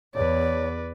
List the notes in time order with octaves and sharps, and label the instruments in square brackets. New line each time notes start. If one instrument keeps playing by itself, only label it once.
[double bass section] E2 [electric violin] B4 D5 [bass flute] C#5